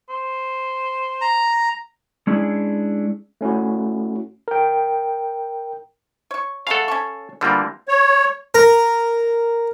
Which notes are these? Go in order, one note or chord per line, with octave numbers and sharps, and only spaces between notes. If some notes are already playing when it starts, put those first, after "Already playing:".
C5
A#5
G#3 C#4 D4 E4 G#4
A3 C#4 E4 F#4
A#4 G5
C#5 C#6
C#3 A3 A4 F5 F#5
C#4 A5 C#6
D3 E3 G3 A#3 F4
C#5
A#4